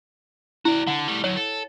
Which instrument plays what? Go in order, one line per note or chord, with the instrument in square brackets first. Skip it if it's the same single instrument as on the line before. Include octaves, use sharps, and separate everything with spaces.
[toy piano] E4 [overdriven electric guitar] F#4 D5
[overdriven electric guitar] D3 [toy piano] F#5
[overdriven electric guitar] G3 A3
[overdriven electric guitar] D2 F#3 [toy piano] C#5
[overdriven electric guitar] A4